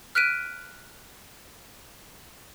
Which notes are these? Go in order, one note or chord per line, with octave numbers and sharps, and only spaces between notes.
F6 F#6 B6 D7 D#7